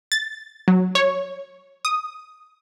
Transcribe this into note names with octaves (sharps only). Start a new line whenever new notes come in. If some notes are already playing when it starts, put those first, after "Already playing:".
A6
F#3
C#5
D#6